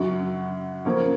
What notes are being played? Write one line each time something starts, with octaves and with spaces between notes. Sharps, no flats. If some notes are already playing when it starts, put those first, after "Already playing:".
Already playing: F#2 C#3 F#3
C#3 F3 A#3 C#4